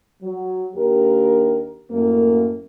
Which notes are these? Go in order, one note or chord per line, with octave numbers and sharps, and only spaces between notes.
F#3
D#2 D4 G4 A#4
F#2 A2 A#3